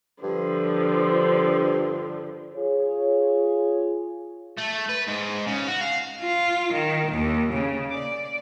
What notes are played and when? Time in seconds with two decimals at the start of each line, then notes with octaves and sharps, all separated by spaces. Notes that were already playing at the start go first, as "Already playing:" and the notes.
0.23 G2 D3 F3
2.54 F4 G#4 C#5
4.57 A3
4.89 B4
5.07 G#2
5.46 C#3
5.67 F#4
5.80 F5
6.21 F4
6.73 D#3
7.12 D#2
7.53 C#3
7.92 D5